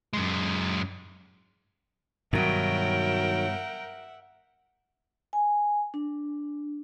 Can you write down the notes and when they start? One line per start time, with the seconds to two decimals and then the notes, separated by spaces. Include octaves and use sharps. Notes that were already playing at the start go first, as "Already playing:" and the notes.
0.13 F#2 G#3
2.33 G2 B2 D#3 F#3 A#4 E5 F#5 G5
5.33 G#5
5.94 D4